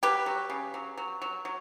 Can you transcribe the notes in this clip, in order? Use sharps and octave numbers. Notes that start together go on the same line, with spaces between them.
F#3 G4 B4
F#3
C#3
F#3
F#3
F#3
F#3